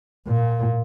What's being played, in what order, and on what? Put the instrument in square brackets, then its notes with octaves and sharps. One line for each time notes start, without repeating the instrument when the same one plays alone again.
[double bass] A#2